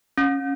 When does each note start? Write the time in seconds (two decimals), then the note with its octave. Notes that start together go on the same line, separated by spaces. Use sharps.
0.17 C#4